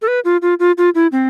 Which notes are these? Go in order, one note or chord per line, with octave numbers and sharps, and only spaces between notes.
A4
B4
F4
F4
F4
F4
E4
C4